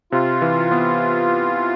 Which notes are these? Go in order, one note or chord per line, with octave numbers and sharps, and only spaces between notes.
C3 F4
E3
B3